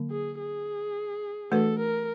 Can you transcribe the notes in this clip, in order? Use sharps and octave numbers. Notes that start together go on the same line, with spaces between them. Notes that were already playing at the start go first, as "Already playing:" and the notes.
Already playing: D3 F#3 A#3
G#4
G#4
E3 A3 D4 F#4 A4 B4
A#4